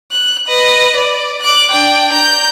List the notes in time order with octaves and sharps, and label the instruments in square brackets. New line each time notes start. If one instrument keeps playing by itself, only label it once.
[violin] F#6
B4 D#5
D5
D6 F#6
D4 G5
A#5 G6